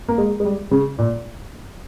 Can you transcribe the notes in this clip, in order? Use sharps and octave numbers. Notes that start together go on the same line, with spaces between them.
A#3
G#3
G#3
G3
C#3
A#2